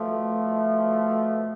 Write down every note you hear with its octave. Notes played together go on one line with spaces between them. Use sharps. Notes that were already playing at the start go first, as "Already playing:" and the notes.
Already playing: B2 F3 A3
B2
B2
B2